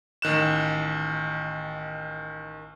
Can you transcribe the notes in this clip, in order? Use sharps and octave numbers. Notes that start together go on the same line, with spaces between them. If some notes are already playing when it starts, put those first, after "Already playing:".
A1 D#3 F#6 E7